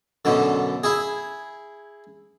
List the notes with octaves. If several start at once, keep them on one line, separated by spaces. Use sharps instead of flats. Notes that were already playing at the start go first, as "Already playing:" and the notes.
F#2 B2 D3
E4 G#4